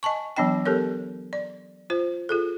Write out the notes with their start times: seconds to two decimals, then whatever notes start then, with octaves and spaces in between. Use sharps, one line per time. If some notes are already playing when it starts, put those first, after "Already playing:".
0.03 D#5 G#5 A5 C#6
0.37 E3 F#3 B3 D4 D#5 G5
0.66 B3 G4 A4 A#4 C#5
1.33 D5
1.90 F4 C5
2.29 F4 G#4 A4